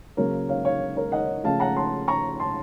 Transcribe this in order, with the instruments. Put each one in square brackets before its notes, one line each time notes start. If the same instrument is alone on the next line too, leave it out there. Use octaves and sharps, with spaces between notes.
[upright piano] C#3 F#3 A#3 A#4 C#5
C#5 F5
C#5 F5
A#4 C#5
D#5 F#5
C#3 F3 A3 F5 A5
F#5 A#5
A5 C6
A#5 C#6
A5 C6